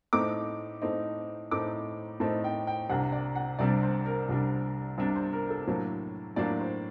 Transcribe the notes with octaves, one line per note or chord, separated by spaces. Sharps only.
A2 A3 C4 D#4 D6
A2 A3 C4 D#4
A2 A3 C4 D#4 D6
A2 A3 C4 D#4 A5
G5
G5
C2 C3 G3 D4 F#5
D5
F#5
C2 C3 G3 D4 D5
C5
A#4
C2 C3 G3 D4
C2 C3 G3 D4
C5
A#4
A4
A2 F#3 A#3 D4
A2 F#3 A#3 D4 D5
C5